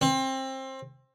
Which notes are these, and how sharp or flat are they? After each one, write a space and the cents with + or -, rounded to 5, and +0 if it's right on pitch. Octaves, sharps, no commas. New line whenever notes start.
C4 +25